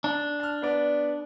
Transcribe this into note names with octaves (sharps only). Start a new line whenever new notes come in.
D4
A5 F6
B3 D5